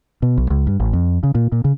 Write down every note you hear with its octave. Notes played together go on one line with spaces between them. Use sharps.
B2
B1
C#2
G2
A1
F2
C#3
A#2
A#2
C#3